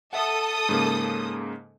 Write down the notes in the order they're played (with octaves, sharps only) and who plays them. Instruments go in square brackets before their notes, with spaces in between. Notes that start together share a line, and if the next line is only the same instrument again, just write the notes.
[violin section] A4 D#6 [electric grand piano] E5 F#5
[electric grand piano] G#2 C#3 A#3